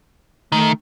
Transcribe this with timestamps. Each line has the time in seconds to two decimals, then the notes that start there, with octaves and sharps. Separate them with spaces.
0.52 D#3 A3